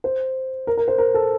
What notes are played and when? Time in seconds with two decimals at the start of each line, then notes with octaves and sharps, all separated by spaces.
0.04 C5
0.67 A#4
0.77 A#4
0.88 C5
0.98 A#4
1.14 A4